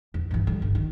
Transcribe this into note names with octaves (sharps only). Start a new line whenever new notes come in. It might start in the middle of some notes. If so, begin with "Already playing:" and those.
E2
G2 E3
D3 G3
G1
D#3